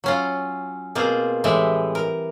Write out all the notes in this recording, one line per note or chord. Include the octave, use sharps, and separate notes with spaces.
F#3 C#4 F4
B2 A#3 C4 F4 G#4
A2 E3 G3 G#3 E5
A#4